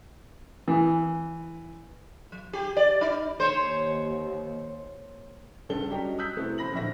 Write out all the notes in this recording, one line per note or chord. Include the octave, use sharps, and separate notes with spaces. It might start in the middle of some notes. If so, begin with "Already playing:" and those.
E3
F#3
G4
D5
D#4
D#2 C5 C#5
C#2 G2 A4 G7
F#3 G3 C#4 G4 D#5
D#6 E6 F#6 G6 B6
C3 A3 B3 E4
A1 C5 B5 A#6 F#7
A#1 D3 C4 E5 A#6